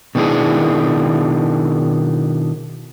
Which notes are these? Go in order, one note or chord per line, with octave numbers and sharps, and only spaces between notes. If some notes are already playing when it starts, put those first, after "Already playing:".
B2 D#3 B3 D4 E4 G#4